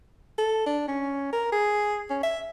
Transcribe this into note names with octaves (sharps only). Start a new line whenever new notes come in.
A4
D4
C#4
A#4
G#4
C#4
E5